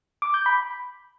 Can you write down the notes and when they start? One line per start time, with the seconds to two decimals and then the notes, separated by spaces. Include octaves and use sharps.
0.22 D6
0.34 G6
0.46 B5